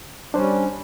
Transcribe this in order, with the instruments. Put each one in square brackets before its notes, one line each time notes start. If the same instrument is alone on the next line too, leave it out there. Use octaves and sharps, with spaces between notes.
[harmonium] G3 C#4 [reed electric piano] D4 C5